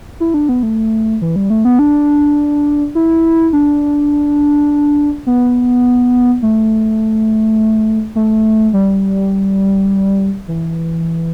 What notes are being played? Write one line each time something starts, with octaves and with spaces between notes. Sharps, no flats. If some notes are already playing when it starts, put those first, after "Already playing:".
E4
D4
B3
A3
E3
G3
A3
B3
D4
E4
D4
B3
A3
A3
G3
E3